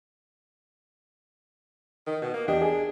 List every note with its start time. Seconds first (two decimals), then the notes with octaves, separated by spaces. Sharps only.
2.06 D#3
2.22 B2
2.34 A#3
2.48 E2 D4 G4 D#5
2.62 G#4